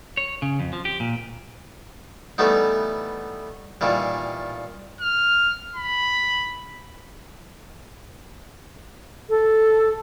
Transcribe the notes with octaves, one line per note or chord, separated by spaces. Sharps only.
C#5
C#3
F2
F3
G4
A#2
E3 G3 A3 B3 D#4
A#2 D#3 E3 G3
F6
B5
A4